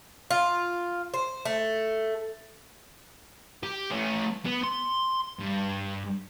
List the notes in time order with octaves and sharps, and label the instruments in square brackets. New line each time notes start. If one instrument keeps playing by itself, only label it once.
[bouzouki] F4
C5
A3
[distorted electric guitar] G4
A3 C#4
B3
C6
G2